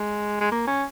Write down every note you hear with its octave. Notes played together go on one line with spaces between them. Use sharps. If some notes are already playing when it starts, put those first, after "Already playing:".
Already playing: G#3
G#3
A#3
C#4